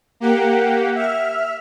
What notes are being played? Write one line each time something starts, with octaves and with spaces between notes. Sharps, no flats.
A#3 G4 F#5
E5 F6